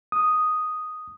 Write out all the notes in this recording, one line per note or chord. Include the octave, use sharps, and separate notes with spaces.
D#6